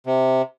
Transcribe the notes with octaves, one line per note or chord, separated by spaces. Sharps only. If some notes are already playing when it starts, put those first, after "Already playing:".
C3